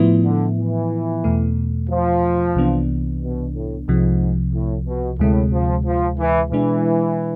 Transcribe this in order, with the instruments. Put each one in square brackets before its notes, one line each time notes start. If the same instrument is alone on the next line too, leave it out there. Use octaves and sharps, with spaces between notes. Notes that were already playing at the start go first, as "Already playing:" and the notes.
Already playing: [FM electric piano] A2 F3 B3 E4
[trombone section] D3
E3
[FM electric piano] E2 B2 A3
[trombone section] F3
[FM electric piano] C2 C3 E3 B3 D4
[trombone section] B2
A2
[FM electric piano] C2 C3 F3 [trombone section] G#2
[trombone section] A2
B2
[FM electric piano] D2 C3 G#3 [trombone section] A2
[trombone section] F3
F3
E3
[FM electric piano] B2 G#3 D4 [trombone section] E3